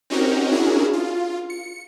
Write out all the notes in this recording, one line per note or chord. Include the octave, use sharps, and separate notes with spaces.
C4 C#4 D#4 F#4 G4 A#4
C#4 D4 E4 F#4 G#4 A#4
F4
C#7